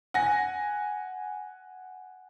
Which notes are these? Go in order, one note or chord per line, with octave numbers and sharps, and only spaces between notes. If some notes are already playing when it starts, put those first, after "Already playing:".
F#5 G#5 A#6